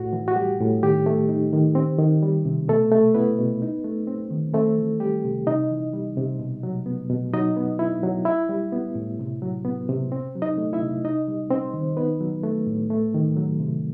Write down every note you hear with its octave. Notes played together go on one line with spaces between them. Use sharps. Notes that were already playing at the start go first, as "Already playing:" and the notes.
Already playing: A2 F#4
E3
F#4
G3 G4
A2
D#3 G4
A3
D#4
D#3
C4
D#3
G3
C3
B2 A3 A4
A3
B3 E4 B4
B2
D#4
A3
C4
D#3
A3 C4 A4
E3
G3 G4
C3
C3 D#4 D#5
E3
G3
C3
B2
F#3
B3
B2
F#3 D#4 D#5
B3
E4
F#3
E4 E5
G3
B3
A2
C3
F#3
B3
C3
C4
F#3
D#4 D#5
A3
E4 E5
C3
D#4 D#5
G3
C4 C5
D#3
B3 D#4 B4
F#3
A3
A2
A3
D#3
F#3
C3